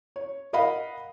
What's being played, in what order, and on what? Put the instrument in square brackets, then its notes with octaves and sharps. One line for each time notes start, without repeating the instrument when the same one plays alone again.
[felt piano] C#5
A#4 D#5 F5 F#5 B5